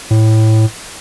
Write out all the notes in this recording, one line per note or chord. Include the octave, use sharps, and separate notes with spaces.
A2